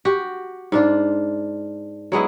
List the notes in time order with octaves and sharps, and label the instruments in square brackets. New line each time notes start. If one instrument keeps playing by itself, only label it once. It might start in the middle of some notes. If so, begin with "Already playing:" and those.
[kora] F#4 G4
G#2 D4 F4
F#3 G#3 B3 E4